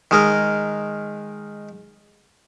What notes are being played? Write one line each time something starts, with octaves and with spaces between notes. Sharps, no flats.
D#3 G#3 A#4